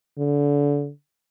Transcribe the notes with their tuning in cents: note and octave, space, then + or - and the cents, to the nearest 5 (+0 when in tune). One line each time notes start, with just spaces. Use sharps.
D3 -30